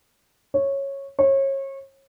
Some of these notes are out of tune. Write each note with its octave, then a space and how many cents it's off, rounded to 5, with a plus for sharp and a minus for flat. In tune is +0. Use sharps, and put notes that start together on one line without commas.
C#5 -10
C#5 -30